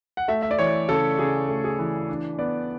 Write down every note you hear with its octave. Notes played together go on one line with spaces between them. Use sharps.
F#5
A3 E5
E5
D5
E3 C#5
C#3 A4
C#3 G#4
A3
G#4
E3
D4
B3 D5